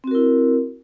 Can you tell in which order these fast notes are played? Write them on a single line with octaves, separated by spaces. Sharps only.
C4 F#4 A#4 E4